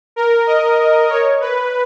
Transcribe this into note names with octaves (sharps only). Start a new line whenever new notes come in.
A#4
D#5
C#5
B4